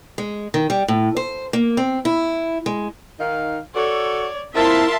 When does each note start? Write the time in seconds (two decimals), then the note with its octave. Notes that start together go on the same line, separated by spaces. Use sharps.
0.18 G#3
0.54 D#3
0.70 G3
0.88 A2
1.17 C5
1.53 A#3
1.77 C4
2.05 E4
2.66 G#3
3.19 D#3 D#4 F5
3.75 F#4 A4 C#5 D5
4.55 A#3 C4 E4 F4 A#4 E5 A5 C6